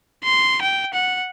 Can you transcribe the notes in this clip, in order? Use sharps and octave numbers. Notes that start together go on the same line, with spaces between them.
C6
G5
F#5